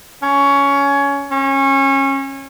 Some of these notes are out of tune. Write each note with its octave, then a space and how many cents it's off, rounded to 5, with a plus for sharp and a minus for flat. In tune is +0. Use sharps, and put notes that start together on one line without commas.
C#4 +15
C#4 -25